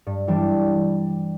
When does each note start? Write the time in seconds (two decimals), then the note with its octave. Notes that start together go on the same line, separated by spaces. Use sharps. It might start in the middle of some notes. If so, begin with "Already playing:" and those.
0.07 G2
0.27 E3 G3 D4